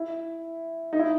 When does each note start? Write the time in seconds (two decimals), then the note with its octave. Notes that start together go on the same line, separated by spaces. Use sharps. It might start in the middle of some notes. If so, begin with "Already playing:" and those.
Already playing: E4
0.93 D#4
0.99 E4